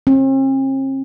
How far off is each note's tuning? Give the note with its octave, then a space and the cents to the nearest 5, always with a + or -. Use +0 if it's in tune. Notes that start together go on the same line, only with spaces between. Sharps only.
C4 +45